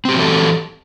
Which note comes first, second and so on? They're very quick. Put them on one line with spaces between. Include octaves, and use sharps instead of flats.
C4 G4 F#3 E3 A4